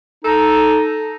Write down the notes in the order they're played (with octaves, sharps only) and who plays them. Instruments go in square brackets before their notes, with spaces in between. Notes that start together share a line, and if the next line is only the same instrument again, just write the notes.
[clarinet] D#4 [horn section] A4